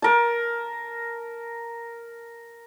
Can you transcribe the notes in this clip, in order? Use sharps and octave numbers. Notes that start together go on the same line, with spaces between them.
A#4 A5